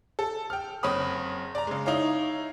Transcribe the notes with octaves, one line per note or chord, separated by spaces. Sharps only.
A4
G5 F6
F#1 C4 C#5 B5 D#6
D5 A#5
C#3 G#3
D#4 E4 C#5 F5 A#5